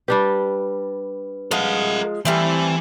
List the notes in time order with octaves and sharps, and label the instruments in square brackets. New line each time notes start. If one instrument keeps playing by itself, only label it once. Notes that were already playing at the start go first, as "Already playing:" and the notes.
[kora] G3 D4 G4 [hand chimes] B4
[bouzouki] F3 G#3 [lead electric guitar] A#4 F#5
[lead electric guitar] E3 [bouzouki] G3 A3 C4